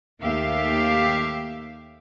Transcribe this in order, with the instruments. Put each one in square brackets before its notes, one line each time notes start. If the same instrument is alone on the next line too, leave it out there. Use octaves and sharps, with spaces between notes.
[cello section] D#2 A3 G4 E5 F5